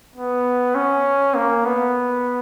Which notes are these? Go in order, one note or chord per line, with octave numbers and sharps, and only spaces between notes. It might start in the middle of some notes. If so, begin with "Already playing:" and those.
B3
C#4
A#3
B3